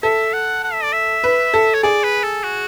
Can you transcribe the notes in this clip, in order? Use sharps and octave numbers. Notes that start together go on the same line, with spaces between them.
A4 E5
F#5
F#5
E5
D5
E5
B4
A4
C#5
G#4 D5
B4
A4
F#4